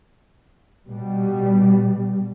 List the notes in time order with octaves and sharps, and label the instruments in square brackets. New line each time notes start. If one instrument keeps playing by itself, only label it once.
[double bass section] B2 G3